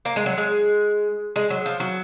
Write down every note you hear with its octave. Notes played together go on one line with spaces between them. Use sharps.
A#3
G#3
F#3
G#3
G#3
F#3
F3
F#3